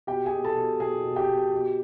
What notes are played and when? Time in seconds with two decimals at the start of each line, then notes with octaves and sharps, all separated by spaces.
0.07 B2 G4 G5
0.26 G#4 G#5
0.32 B2
0.44 A4 A5
0.56 B2
0.80 B2 G#4 G#5
1.05 B2
1.16 G4 G5
1.29 B2
1.53 B2